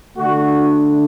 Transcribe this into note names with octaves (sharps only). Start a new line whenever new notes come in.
D3 A3 D4 F#4